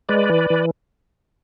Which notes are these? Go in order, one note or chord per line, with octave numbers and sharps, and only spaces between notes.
G#3 B4 D5
E3
E3